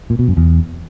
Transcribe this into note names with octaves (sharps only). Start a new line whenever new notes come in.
A#2
B2
F#2
E2